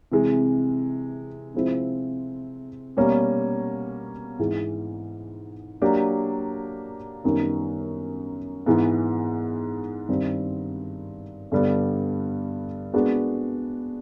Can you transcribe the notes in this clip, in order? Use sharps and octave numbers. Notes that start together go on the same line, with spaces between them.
C3 E3 G#3
C3 F3 G#3 C4 E4
B2 G3 A#3 C#4
G#2 E3 G#3
F#3 A#3 D4 G4
F#2 D#3 G3 B3 D#4
G#2 E3 G#3 B3
G2 D#3 G3 C4
G2 D3 G3 B3
G#3 B3 D4 F#4 A#4